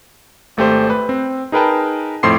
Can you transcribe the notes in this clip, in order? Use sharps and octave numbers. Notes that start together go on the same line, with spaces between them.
G#1 A3 G4 C5
B4
C4
D#4 G#4 A#4 B4 G5 A5
F2 A2 C4 C6 D6 C7